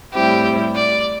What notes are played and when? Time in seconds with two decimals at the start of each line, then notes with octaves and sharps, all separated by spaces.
0.14 A2 G3 C4 E4 G4
0.75 D5